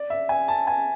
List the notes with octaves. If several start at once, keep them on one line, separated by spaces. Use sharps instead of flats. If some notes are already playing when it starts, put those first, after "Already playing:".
Already playing: D5
E5
G#5
A5
G#5